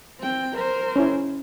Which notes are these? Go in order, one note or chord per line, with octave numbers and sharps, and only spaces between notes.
C4 G5
A#4 C5
C#4 E4